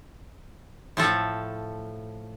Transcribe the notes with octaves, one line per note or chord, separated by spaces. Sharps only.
A2 F3 A4